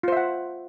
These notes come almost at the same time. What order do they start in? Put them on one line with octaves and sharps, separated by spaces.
F4 C5 E5 F#5